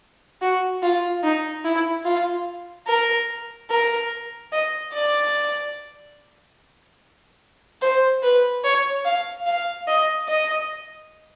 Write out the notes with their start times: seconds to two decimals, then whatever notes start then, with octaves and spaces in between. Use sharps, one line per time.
0.42 F#4
0.82 F4
1.24 D#4
1.65 E4
2.05 F4
2.87 A#4
3.70 A#4
4.52 D#5
4.93 D5
7.81 C5
8.22 B4
8.64 C#5
9.05 F5
9.47 F5
9.87 D#5
10.28 D#5